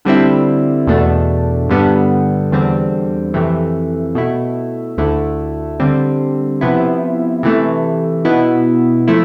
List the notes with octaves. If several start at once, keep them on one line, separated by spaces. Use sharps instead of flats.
D3 G3 C4 E4
E2 B2 A3 D4
G2 D3 G3 B3
E2 D3 G3 C4
F2 C3 E3 A3
B2 A3 E4
D2 D3 A3 E4
D3 G3 C4
C3 F3 B3 E4
C3 E3 A3
B2 B3 E4
F3 A3 E4